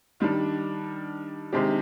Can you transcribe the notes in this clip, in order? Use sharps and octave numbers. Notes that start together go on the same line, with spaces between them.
D#3 G3 D4
C3 D#3 G#3 D4 G4